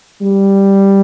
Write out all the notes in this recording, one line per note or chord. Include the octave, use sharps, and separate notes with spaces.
G3